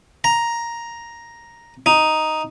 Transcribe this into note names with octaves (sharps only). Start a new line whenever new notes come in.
A#5
D#4